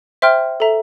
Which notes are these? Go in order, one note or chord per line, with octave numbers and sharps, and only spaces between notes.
C5 E5 G5 C6 F6
A4 E5 A#5